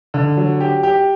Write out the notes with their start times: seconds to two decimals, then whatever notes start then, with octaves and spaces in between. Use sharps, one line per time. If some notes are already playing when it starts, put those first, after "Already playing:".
0.14 D3
0.37 F#3
0.60 G4
0.83 G4